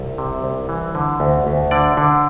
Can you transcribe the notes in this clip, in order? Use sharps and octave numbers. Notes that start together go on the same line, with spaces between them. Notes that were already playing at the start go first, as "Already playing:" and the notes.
Already playing: C2 A4
C3
C2
E3
D3
D2
D2
D3 D5
D3